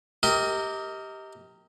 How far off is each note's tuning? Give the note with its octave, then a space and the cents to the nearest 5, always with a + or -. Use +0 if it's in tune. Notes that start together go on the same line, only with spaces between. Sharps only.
G4 +0 A#4 -15 D#5 +30